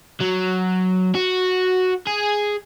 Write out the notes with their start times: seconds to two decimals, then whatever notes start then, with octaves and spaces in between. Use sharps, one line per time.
0.21 F#3
1.15 F#4
2.07 G#4